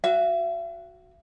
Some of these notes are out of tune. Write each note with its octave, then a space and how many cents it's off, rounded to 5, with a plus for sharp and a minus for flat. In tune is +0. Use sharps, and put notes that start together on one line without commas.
F#4 +0 E5 +40